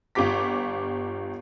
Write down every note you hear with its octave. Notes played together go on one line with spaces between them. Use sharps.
G1 F4 G4 D6 B6